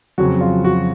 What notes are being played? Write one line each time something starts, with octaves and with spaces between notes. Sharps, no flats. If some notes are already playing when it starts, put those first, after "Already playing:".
F2 C#3 F#3 F#4
F4
F#4